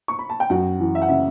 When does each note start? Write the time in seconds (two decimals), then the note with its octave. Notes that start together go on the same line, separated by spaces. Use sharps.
0.08 C#6
0.19 B5
0.30 A5
0.40 G5
0.50 F#2 F#4 F#5
0.80 E3
0.95 E5
1.02 F#5
1.09 C#3 E5